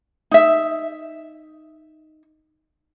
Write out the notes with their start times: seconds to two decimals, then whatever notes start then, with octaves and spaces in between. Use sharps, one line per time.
0.31 D#4 E5